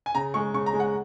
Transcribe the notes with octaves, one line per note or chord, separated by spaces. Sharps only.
G#5
C#3 A#5
G#3 C#6
C#3 C#6
A#5
G#3
F#5